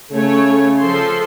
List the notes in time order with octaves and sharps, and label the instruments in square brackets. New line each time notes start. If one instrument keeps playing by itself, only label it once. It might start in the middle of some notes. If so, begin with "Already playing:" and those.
[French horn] C#3 [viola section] A3 C#5
[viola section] F3 A4 C6